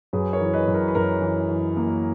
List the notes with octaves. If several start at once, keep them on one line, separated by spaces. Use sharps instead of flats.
F#2 G#4 B4
A#4 C#5
E3
B4 D#5
F#2
A#4
B4
F#2 A#4
E3
E3
A#3